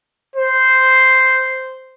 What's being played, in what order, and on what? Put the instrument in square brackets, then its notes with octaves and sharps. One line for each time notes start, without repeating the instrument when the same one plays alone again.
[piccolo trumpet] C5